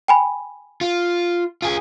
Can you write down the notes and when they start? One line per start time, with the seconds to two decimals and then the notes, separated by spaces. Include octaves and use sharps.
0.08 G5 G#5 B5
0.81 F4
1.62 F4 G#4